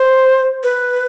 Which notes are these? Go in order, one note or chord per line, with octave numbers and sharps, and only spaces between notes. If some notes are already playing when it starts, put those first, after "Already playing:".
Already playing: C5
B4